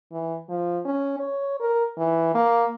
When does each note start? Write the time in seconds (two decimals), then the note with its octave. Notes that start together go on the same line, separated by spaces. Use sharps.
0.12 E3
0.49 F3
0.85 C#4
1.20 C#5
1.60 A#4
1.98 E3
2.35 A#3